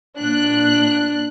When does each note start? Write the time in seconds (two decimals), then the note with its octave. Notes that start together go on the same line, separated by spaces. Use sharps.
0.19 A#2 D4 F#6